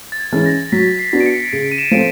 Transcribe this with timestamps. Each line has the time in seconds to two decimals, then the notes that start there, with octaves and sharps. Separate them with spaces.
0.12 A6
0.20 G#6
0.32 E3 G#3 C#4
0.46 A#6
0.72 F#3 B6
0.99 C7
1.13 B3 D4 F#4
1.20 D7
1.26 C#7
1.53 C#3 D7
1.72 D#7
1.78 E7
1.91 F3 A3 C4 D7